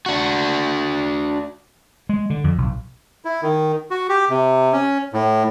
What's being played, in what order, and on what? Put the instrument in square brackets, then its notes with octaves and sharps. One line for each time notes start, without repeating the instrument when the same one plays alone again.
[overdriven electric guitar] D4 F#4
[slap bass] G#3
D3
F2
B1
[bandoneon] E4
D#3
F#4
G4
C3
C#4
A2